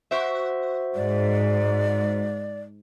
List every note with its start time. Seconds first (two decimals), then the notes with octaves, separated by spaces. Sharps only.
0.11 F#4 C5 E5
0.95 G#2 D5